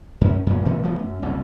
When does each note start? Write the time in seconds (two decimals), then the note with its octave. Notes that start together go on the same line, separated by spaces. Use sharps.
0.21 F#2 C#4
0.47 F#2 A#2 F#3
0.65 A#2 E3 F3 A3
0.83 E3 A3 B3
0.99 F#2
1.22 F#1 C2 F2